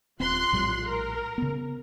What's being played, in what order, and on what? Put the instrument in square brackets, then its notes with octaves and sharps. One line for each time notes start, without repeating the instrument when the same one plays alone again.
[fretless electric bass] D#1 C4 [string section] F4 C6 F#6
[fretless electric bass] A#1 A2 G3
[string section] A#4
[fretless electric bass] C#3 B3